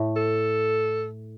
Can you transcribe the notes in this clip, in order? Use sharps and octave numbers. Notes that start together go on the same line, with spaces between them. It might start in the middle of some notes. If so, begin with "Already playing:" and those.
Already playing: A2
A4